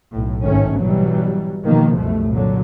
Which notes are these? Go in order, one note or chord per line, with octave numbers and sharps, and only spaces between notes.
B1 A2
G#1 G#2 D#3 A3 C#4
B2 E3 F#3 G3
B2 D#3 F3 A#3
C2 F#2 B2 A3
A#2 D3 F#3